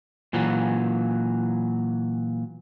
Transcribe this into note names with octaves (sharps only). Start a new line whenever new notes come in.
A#2 E3 F#3